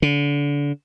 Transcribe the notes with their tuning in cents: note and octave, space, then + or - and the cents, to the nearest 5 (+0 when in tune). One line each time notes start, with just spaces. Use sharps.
D3 -30